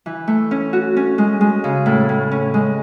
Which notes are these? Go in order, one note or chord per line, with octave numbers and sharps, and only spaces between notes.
E3
A3
C#4
F#4
C#4
G#3
G#3
C#3
A2
A2
C#4
G#3